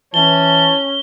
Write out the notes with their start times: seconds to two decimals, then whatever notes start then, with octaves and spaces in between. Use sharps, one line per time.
0.14 E3 C#4 A5 G7